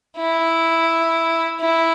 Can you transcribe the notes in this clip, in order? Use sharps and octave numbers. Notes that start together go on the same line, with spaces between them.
E4
E4